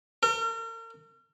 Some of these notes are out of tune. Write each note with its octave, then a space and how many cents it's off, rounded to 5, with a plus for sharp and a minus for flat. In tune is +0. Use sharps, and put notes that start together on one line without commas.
A#4 -40